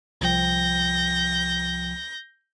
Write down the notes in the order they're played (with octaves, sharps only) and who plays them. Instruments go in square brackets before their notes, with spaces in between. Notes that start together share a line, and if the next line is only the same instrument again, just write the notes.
[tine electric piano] C2 F3 G5 [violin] G6 A#6